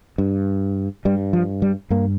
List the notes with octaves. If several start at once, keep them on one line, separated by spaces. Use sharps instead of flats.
G2
G2 G3
F3
G3
G2 A#3